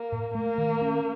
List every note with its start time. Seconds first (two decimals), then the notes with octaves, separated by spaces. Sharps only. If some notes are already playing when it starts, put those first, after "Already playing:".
Already playing: A#3
0.12 A2
0.35 A3 A#3
0.58 D#3
0.82 C#4